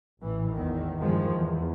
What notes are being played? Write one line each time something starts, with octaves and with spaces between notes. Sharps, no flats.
A1 A2 E3
E2 G#2 D#3
G1 D#3 F3 G#3
E2